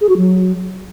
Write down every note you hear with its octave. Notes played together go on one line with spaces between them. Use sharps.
G#4
F#4
F#3